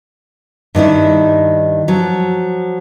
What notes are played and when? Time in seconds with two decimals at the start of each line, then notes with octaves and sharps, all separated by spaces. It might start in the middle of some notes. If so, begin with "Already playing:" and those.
0.75 G2 D#3 D#4 E4
1.88 F3 F#3